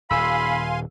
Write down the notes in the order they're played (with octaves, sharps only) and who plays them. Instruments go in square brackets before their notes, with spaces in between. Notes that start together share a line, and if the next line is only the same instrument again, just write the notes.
[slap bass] D#1 [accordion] F5 G#5 C6 [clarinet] B5 [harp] E6